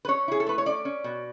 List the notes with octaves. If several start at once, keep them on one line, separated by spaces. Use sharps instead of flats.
B4
C#4 C#5
E4 G#4
A4
A3 B4
C#5
C#4 D5
C#4
B2